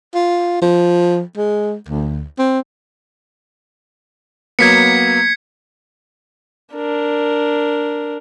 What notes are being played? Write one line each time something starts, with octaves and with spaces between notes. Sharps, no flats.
F4
F3
G#3
D2
C4
F#3 A#3 B3 G#6 B6 C#7
D4 A#4